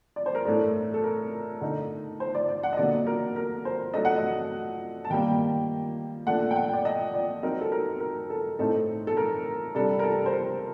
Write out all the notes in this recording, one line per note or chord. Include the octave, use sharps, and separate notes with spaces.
D5
C5
A#4
A2 A3 D4 A4
A4
A#4
D3 A3 D#4
C5
D5
D5
F#5
D#5
D3 F#3 A#3 D5
A#4
A#4
C5
F#3 A3 D4 D#5
F#5
D#5
A5
D#3 G3 A#3 G5
A#2 A3 D4 F#5
G5
F#5
D5
D#5
D5
F#3 C4 D#4 A#4
A4
A#4
A#4
A4
A2 A3 C4 D#4 A4
A4
A#4
C3 G3 D4 A4
A#4
A4
C5
A#4